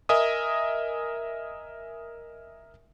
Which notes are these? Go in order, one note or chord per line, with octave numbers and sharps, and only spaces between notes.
A#4 D#5 E5 G#5 D#6